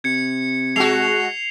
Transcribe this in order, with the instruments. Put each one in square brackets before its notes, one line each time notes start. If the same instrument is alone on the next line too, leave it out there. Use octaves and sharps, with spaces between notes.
[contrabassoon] C3 [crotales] G#6 C#7
[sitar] G#3 F#4 [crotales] C7 F7 G7